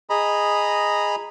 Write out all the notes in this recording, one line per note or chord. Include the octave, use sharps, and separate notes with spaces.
G#4 D#5 A#5 B5